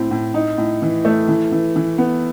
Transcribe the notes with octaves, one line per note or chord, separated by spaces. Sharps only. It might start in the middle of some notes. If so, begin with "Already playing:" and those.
Already playing: A2 C4
A2
D#4
A2
E3
A3
E3
E3
E3
B3